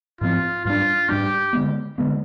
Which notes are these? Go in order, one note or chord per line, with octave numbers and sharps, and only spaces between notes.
G#2 F3 C4 F4
G#2 G3 D4 F4
G#2 G3 D4 G4
D3 G#3 B3
D3 G#3 B3